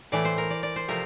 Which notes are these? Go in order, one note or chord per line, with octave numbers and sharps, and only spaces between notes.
A2 E3 A3 D5
C5
A#4
D5
D5
C5
C3 F3 A3 A#4